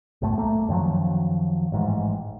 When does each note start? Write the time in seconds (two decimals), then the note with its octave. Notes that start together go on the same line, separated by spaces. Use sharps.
0.22 B1 F#2 A2 A3
0.38 A3 A#3
0.68 F#2 D#3 F3 F#3
1.72 A1 G#2